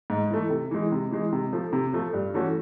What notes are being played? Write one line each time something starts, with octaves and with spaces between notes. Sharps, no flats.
G#2
E3 A3
C3
E3 G#3
C3
E3 G#3
C3
F3 A3
C3
F3 A3
G2
E3 A3 C#4 F#4